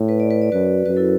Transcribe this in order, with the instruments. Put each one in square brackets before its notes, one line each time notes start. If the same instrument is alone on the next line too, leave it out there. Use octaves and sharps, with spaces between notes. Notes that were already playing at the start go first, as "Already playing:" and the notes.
Already playing: [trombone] A2
[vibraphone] B4
D5
B4
D5
[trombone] F#2 [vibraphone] F#4 B4
[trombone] F#2 [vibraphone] F#4 B4
[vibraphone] E4 A4